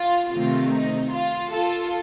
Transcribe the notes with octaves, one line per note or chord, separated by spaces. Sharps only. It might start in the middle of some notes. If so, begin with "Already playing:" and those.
Already playing: F4
C3 D#3 A3 C4 F4
D#4
F4
F4 A4